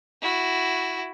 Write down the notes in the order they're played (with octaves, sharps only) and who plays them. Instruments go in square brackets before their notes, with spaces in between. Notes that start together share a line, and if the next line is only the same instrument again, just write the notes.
[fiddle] E4 F#4